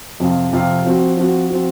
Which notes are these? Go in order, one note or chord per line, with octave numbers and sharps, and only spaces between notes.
F2 C3 F3 C4 F4
F2 C3 F3 C4 F4
F3 C4 F#4
F3 C4 F#4
F3 C4 F#4